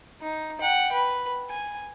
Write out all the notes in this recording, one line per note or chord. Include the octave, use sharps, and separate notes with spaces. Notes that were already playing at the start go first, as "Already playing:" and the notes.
D#4
F#5 G5
B4
G#5